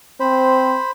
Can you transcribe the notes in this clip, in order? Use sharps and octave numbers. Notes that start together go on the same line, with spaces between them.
C4 C5 B5